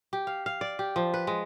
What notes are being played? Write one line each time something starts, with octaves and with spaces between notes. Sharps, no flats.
G4
F5
F5
D5
G4
F3
B4
G#3